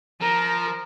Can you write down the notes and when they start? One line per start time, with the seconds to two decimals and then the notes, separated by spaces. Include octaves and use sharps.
0.21 F3 A#4 A#5